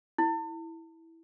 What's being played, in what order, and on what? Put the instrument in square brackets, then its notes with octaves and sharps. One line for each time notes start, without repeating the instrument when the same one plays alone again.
[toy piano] E4